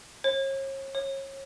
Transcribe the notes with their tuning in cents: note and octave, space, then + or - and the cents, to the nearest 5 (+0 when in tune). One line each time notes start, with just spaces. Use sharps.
C#5 -40
C#5 -30